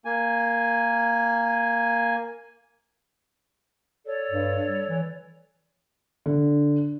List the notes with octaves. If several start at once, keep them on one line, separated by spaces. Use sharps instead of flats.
A#3 G#5
A4 C#5 D5
G2
G3
E3
D3